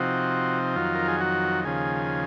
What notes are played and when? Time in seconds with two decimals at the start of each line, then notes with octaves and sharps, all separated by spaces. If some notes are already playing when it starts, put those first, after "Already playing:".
Already playing: C3 F3 C4 D#4 F#4
0.76 F2 D#3 F#3 F4
0.95 A#4
1.08 G#4
1.21 F#4
1.65 D#2 C#3 F3 G#4